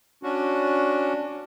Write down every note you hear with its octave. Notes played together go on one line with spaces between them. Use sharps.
C#4 D4 F#4